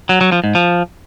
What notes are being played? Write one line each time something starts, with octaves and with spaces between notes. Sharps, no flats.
F#3
F#3
F3
G#2
F3